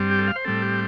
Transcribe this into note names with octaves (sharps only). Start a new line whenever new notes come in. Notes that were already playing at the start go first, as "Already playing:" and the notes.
Already playing: G2 G3 C4
G4
A4
F5
C5
A2 G3 C4 A4
G4